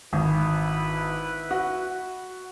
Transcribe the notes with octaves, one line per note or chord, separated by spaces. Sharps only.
G#1 E4 B4
F#4